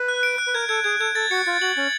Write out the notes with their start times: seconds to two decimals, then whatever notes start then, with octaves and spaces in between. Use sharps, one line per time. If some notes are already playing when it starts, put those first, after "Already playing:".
Already playing: B4
0.08 F#6
0.23 D7
0.38 F#6
0.47 B4
0.54 A#4 G#6
0.69 A4 G#6
0.84 G#4 G#6
1.00 A4 G#6
1.15 A4 A6
1.31 F#4 C#7
1.46 F4 A6
1.61 F#4 F#7
1.77 C#4 A6